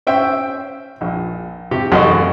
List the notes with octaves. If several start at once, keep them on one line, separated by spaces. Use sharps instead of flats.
C#4 C5 E5 G5
A#1
C3 G4
A1 F#2 F#3 D#5 C6